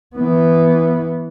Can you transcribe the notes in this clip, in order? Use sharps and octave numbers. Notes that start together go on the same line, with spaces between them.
E3 B3